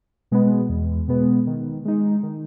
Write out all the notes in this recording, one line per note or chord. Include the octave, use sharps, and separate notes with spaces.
B2 G#3 B3
E2
B2 G#3 B3
D#3
G#3 D#4
D#3